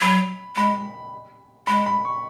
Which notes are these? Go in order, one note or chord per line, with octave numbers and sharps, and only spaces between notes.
F#3 B5
G#3 B5
G#3 B5
B5
C#6